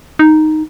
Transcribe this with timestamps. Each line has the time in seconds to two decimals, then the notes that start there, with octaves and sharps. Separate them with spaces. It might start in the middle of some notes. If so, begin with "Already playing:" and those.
0.19 D#4